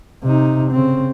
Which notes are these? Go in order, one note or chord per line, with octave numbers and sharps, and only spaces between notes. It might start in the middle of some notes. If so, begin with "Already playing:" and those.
C3 D#4
C#3 C4